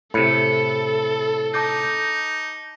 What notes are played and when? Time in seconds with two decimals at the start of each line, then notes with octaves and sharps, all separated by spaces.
0.14 A2 C3 A4 B5 C#7
1.54 D#4 A5 D6 G6